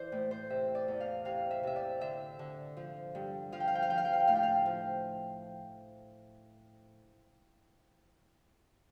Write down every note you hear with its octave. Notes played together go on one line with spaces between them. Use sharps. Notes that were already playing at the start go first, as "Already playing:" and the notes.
Already playing: E3 C5 D5
A2
C5
C3 E5
D5
E2
F5
C3 F5
E5
C3 E5
D5
D3 E5
D3
F3
G2
F3 F5
G5
F5
G5
F5
F3 G5
F5
G5
F5
G5
A2 F5
G5
F5
F3